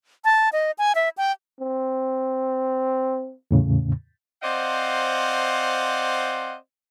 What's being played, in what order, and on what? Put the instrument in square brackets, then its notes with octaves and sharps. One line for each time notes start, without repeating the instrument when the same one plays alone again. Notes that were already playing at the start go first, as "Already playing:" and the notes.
[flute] A5
D#5
G#5
E5
G5
[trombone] C4
[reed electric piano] E2 A2 C#3
[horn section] C4 C5 D5 D#5 F5 F#5